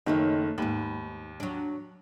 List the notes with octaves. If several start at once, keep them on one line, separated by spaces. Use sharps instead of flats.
F#1 D#3 A3 C#4 D#4
D#2 G#2 B4
F#3 D4